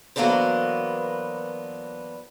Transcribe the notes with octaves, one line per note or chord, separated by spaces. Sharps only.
E3 F#3 A#3 B3 D4 C5